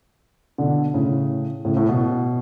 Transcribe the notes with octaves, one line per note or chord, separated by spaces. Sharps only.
B2 D3
A2 C#3
A2 C#3
A2
B2